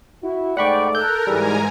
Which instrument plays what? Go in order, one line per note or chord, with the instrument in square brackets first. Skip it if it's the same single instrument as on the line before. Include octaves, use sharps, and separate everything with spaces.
[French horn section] E4 F#4
[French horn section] G#2 A3 D5 [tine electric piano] F#5 B5 C#6 [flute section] G5
[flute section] A4 E6 F#6 [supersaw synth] A#4 [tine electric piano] G6
[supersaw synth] G#2 G#5 A#5 [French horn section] E3 G#4 [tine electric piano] G3